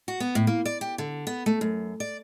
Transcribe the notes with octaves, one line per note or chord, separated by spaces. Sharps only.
F#4
B3
A2
A#3
D5
G4
D3
B3
A3
F#2
D5